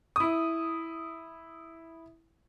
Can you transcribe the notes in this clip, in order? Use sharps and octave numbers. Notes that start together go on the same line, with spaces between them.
E4 D#6